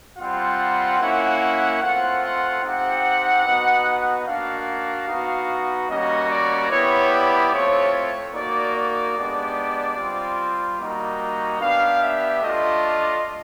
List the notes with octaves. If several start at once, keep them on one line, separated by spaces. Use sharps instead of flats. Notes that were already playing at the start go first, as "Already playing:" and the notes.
G3 C4 F4 F#5
A#3 C#4 E4
A3 C4 F4 F#5
F#5
C4 D#4 G4 F#5
B3 D#4 F#4
A#3 D4 F#4 F5
B3 D#4 F#4
G3 A#3 C#4 F#4 D#5
D5
B3 E4 G4 C#5
D5
A3 C4 F4 C#5
C#5
A#3 D#4 F#4 D5
D5
G#3 B3 D4 G4
G3 C4 F4
G3 A#3 D#4 F#4
B3 D4 G4 F5
E5
A3 D4 F4 D#5